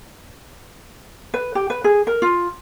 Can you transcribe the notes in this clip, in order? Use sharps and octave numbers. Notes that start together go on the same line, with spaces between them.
B4
G4
B4
G#4
A#4
F4